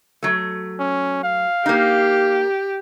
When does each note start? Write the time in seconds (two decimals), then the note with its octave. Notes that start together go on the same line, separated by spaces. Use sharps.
0.23 F#3 A3
0.79 C#4
1.24 F5
1.66 A#3 D#4 G4